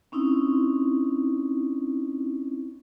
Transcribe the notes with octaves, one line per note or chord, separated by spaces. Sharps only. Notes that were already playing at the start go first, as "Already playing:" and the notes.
C4 C#4 D#4 E4